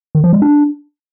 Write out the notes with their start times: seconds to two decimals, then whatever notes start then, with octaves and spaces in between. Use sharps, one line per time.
0.15 D#3
0.24 F3
0.33 G#3
0.42 D4